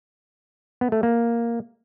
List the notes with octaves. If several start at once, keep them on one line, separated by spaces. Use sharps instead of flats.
B3
A3
A#3